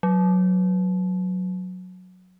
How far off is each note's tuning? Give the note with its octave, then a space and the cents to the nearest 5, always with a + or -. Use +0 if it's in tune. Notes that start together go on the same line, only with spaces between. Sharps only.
F#3 -10